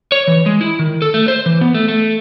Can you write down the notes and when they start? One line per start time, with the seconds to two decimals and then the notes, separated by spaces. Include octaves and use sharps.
0.12 C#5
0.27 E3
0.46 G#3
0.61 E4
0.79 D#3
1.02 A4
1.14 A3
1.28 C5
1.46 E3
1.61 B3
1.75 A3
1.88 A3